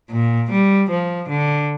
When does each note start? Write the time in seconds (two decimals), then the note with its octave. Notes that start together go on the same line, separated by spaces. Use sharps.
0.11 A#2
0.51 G3
0.90 F3
1.29 D3